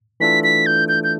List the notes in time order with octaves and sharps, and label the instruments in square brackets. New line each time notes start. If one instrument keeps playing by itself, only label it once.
[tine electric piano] E3 A3 D4 F4 A4 [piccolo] B6
[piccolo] B6
G6
G6
G6